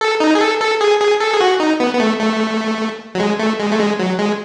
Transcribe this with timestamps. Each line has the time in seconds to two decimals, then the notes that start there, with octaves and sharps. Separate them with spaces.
0.01 A4
0.20 D#4
0.35 G#4
0.41 A4
0.61 A4
0.81 G#4
1.01 G#4
1.20 A4
1.33 G#4
1.41 F#4
1.60 D#4
1.80 B3
1.95 B3
2.00 A3
2.19 A3
3.15 F#3
3.20 G#3
3.40 A3
3.60 G#3
3.72 A3
3.80 G#3
3.99 F#3
4.19 G#3